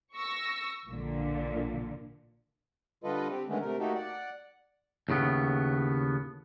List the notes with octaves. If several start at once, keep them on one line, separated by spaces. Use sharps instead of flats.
C#6 E6 A#6
A#1 A#2 D3
D3 G3 F4 A4 B4 D#5
C4 G4
D3 D#3 G#3 A3 B3 C#4
C3 A3 A#4
A3 A#3 D#4 F#4 G4 A4
D5 F#5
D#2 A2 C#3 B3